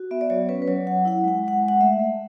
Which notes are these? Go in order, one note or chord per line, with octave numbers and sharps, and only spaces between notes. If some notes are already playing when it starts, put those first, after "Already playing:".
Already playing: F#4
B3 E5
D5
F#3 C#5
C#4 B4
B4
F#3 C#5
F#3 F#5
E4 F#5
G#3 F#5
G#3 F#5
G#3
F#5
A3 E5
A3